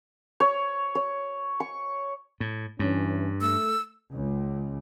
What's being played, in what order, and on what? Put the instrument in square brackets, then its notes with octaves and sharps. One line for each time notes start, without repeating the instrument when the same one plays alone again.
[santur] C#5
C#5
C#6
[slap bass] A2
[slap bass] G2 [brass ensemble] E3 C#4
[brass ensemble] A3 [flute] E6
[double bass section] C#2